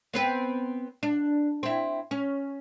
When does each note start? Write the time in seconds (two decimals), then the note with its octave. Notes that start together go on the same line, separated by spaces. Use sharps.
0.14 B3 C4 B4
1.03 D4
1.63 C4 E4
2.11 C#4